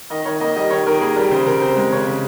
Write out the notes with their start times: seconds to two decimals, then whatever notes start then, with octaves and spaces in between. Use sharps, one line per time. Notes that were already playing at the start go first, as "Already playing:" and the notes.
0.10 D#3 D#5
0.25 D#3 C#5
0.40 A#3 D#5
0.56 G3 D#5
0.70 D#3 C#5
0.87 D#3 A#4
1.01 A#3 G#4
1.16 G3 A#4
1.31 C#3 C5
1.46 C#3 A#4
1.61 C4 C5
1.77 G#3
1.92 C#3 C#5
2.08 C#3